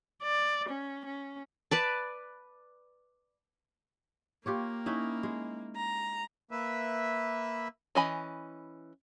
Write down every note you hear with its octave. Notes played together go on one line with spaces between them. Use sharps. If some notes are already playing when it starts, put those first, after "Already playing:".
D5
C#4
C#4
B4 D5 A5
A#3 F4 G4 C#5
C#4 D#4 E4
G#3
A#5
A#3 B4 E5
E3 C#4 D#5 G#5 B5